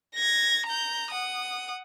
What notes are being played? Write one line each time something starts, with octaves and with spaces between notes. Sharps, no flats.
G#6 A#6
A#5 G6
F#5 D#6